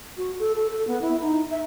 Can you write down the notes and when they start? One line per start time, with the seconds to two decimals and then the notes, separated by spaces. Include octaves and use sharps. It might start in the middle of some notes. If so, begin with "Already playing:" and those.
0.17 F#4
0.39 A4
0.55 A4
0.70 A4
0.87 B3
1.02 E4
1.21 D#4
1.51 E5